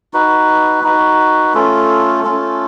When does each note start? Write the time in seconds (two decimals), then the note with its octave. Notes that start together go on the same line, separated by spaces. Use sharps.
0.13 D#4 F#4 B4
0.84 D#4 F#4 B4
1.54 A3 C#4 F4 A4
2.23 A3 C#4 F4 A4